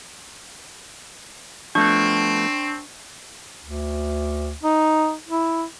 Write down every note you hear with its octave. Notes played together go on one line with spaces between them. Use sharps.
F3 A3 B3 C4 D4 C#6
D2
D#4
E4